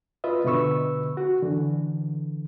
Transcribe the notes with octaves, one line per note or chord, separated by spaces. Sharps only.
F4 B4 D#5 E5
B2 D3 B4 C#6 E6
F#4
D3 E3